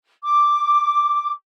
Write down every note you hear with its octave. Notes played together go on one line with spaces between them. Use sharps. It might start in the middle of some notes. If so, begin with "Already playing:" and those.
D6